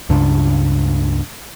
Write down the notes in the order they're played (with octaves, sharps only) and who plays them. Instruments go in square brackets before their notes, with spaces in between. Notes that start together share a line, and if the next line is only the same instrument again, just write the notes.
[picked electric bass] C#2 G2 C#3 D4